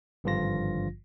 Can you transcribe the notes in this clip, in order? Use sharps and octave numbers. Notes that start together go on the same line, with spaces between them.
G#1 G2 D3 F3 F4 A#6